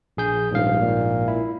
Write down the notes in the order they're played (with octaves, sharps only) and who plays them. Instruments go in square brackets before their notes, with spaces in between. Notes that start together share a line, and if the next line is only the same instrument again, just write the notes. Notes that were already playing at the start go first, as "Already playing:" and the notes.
[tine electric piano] A#1 G#4 G6
[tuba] D#1 [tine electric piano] A#1 G#2 F5
[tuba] A#2
[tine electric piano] E4